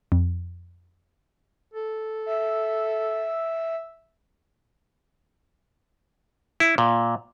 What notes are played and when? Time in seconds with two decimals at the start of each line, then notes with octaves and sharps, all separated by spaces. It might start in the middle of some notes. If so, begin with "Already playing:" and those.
0.12 F2
1.74 A4
2.26 E5
6.60 E4
6.78 A#2